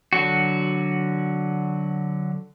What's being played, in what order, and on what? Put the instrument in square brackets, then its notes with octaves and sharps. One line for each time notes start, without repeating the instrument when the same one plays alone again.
[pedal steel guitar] D3 F#3 F#4